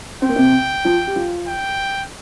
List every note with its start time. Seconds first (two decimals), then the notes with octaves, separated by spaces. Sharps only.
0.22 C4 G5
0.29 A#3
0.36 C3 C4
0.85 F3 F4
1.07 G4
1.16 F3 F4
1.48 G5